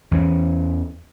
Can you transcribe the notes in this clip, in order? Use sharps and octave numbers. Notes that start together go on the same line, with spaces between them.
E2 E3 C#4